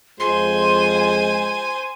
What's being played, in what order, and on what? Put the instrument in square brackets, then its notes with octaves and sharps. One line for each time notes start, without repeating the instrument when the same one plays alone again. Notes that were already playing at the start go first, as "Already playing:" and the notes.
[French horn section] F2 F4 [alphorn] G#3 [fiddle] C5 G#5 [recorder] C6